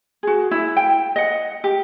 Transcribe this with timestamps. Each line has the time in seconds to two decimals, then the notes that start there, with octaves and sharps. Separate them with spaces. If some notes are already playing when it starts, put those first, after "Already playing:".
0.23 F#4 G#4
0.51 E4
0.77 G5
1.16 D#5 F#5
1.64 G4